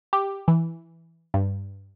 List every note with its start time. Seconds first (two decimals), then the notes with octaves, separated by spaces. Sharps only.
0.13 G4
0.48 E3
1.34 G2